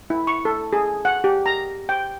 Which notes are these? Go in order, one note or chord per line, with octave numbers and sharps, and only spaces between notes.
E4
C#6
A4
G#4
F#5
G4
A#5
G5